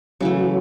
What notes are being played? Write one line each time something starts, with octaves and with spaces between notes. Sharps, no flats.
C#3 E3 F#3 A3